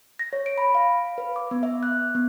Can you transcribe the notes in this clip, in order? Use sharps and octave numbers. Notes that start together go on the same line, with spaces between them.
A#6
C#5
D7
B5
F5
B4
D6
B3
E5
F#6
B3